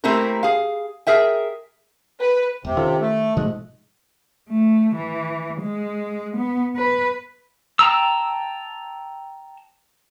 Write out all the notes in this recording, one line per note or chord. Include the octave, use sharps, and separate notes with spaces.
A3 A#3 C4 E4 G4 A#4
G#4 F5
G#4 A#4 E5 G5
B4
E1 C3
D#3 C#4 F4 A4
A3 E5
G#2 B2 F3 A3 D#5 F#6
A3
E3
G#3
B3
B4
G5 A5 A#5 E6